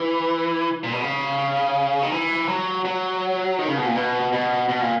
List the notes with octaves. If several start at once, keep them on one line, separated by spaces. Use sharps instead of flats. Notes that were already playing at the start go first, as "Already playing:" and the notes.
Already playing: E3
A#2
B2
C#3
D#3
E3
F#3
F#3
D#3
C#3
B2
A#2
B2
B2
B2
A#2